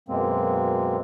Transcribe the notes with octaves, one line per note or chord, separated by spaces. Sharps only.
F#2 B2 G#3 A#3 C4